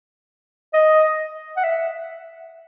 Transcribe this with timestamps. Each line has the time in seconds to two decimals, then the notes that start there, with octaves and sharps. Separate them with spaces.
0.74 D#5
1.57 F#5
1.64 E5